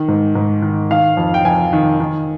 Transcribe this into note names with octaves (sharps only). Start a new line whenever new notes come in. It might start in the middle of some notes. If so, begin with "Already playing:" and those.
Already playing: D#3
G#2
G#2
D#3
D#3 F5
F2
G5
F2 G#5
D#3
D#3